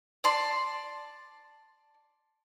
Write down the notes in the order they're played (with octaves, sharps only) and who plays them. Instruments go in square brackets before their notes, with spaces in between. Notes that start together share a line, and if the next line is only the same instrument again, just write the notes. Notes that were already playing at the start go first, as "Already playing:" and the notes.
[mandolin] D5 A5 C6